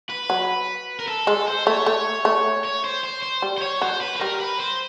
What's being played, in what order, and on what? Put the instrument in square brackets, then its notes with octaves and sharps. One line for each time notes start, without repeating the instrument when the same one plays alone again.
[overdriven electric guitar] B4
[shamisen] F#3
[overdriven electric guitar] A#4
A4
[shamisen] G#3 [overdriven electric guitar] A4
[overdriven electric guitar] C5
[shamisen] A3 [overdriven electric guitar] C#5
[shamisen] A3 [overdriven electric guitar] C#5
[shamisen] A3
[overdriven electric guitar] C#5
C5
C5
C5
[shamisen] G3
[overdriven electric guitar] C5
C#5
[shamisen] F#3 [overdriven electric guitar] C5
[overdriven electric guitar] B4
B4
[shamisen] G3 [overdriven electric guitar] A#4
[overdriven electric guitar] B4
C5